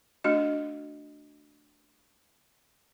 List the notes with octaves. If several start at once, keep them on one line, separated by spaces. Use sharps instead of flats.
A3 D4 F#4 D#5